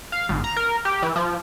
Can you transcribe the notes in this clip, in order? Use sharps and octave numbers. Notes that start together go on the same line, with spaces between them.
F5
G#1
A#5
A#4
G4
E3
F3